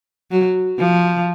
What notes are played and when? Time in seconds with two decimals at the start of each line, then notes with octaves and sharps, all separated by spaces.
0.31 F#3
0.78 F3